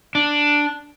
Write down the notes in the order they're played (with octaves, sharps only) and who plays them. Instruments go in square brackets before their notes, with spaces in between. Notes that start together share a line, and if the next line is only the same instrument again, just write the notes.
[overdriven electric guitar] D4